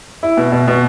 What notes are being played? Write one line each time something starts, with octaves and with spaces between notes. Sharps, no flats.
E4
B2
B2
B2